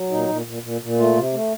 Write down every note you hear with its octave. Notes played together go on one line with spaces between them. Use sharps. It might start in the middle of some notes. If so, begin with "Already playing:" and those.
Already playing: F#3
A#2 D#4
A#2
A#2
A#2
A#2
A3 F4
C3
A3